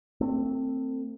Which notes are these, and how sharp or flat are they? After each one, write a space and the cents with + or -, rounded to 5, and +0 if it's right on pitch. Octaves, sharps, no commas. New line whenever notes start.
A3 +40 C4 +0